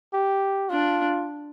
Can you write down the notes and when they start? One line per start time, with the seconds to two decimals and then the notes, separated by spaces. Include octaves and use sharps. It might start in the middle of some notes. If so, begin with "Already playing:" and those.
0.14 G4
0.70 D4 F4